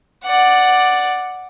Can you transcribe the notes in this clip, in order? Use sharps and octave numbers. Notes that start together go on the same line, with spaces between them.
D5 F#5